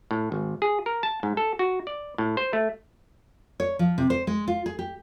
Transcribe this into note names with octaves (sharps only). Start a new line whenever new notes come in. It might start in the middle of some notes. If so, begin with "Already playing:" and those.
A2
G#1
G#4
A#4
A5
G#2
A4
F#4
D5
A2
C5
A3
C#5
F3
C3
C5
G#3
F4
G#4
G4